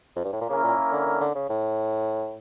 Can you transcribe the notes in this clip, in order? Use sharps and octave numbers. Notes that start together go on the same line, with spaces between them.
F2
G2
A2
A#2
C#3 A#3 C#4 E4 A#4
A#2
D3
D3
D3
C#3
A2